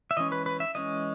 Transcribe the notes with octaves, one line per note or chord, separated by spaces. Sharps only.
E5
E3 G#3 C#4 D#5
B4
B4
E5
E3 G#3 C#4 D#5